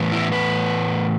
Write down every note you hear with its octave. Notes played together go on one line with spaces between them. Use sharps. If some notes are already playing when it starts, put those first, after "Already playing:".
Already playing: A2 E3 B3
E4
B4